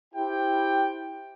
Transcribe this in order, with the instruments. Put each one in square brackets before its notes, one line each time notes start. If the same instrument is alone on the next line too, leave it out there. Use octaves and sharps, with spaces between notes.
[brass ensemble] E4 G4 C5 G5